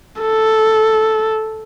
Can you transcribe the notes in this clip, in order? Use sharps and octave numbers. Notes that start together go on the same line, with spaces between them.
A4